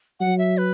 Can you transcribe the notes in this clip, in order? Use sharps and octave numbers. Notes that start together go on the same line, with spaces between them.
F#3 F#5
E5
B4